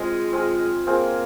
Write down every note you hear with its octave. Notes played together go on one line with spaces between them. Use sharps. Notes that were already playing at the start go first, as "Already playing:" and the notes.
Already playing: G#3 C4 F4 G#4
C4 F4 G#4
A#3 C4 F4 G#4